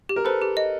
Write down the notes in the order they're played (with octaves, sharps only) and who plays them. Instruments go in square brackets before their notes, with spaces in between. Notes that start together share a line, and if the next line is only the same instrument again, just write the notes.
[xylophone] G4
[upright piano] A#4
[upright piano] A4 B4 [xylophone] C5
[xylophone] G4
D#5